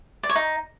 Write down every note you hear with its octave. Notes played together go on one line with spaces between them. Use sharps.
D5
C#5
D#4